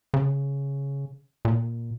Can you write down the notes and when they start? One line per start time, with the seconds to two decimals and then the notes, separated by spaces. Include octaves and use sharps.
0.14 C#3
1.45 A#2